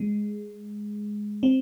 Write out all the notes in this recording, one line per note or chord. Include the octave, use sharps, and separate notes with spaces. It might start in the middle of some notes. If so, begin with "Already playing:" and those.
Already playing: G#3
C4